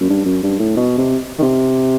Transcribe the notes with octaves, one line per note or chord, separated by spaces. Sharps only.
F#2
G2
F#2
G2
A2
B2
C3
D#3
C3